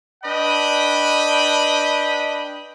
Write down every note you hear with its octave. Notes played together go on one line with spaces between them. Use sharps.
D4 B4 D#5 G5 B5